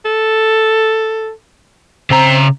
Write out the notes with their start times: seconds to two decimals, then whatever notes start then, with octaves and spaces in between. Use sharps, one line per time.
0.05 A4
2.10 C#3 C4 A#5